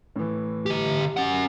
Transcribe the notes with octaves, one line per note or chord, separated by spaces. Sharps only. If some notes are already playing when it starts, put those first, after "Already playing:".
A2 E3
D3 G4
C#4 F#5